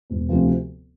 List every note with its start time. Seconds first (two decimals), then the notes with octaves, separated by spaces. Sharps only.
0.10 E1
0.29 D2 C3 F3